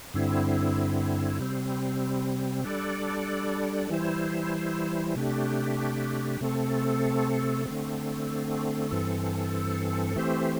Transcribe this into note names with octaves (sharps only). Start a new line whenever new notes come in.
G2 D3 C4 E4
C3 G3 C4
G3 D4 A4 D5
E3 G3 E4 C5
C3 A3 D4 G4
C3 A3 C4 A4
D3 A3 C4
G2 E3 C4 A4
E3 A3 C4 G4 C5